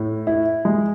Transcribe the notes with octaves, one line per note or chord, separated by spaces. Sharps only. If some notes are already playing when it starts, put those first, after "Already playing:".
Already playing: A2
E4
G#3